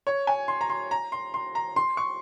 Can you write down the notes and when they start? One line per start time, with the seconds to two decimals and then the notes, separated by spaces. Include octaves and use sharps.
0.07 C#5
0.27 G#5
0.48 C6
0.61 A#5
0.70 C6
0.91 A#5
1.12 C6
1.34 C6
1.55 A#5
1.76 C6
1.97 C#6